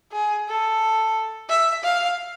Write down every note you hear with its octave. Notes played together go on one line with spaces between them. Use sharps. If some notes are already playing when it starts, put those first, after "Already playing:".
G#4
A4
E5
F5